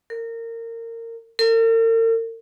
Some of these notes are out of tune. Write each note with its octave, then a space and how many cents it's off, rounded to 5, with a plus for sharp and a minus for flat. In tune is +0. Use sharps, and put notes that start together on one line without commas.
A#4 -25
A#4 -45